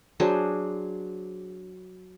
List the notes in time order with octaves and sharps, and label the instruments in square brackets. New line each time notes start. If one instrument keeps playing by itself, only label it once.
[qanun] F#3 D4 G#4 C5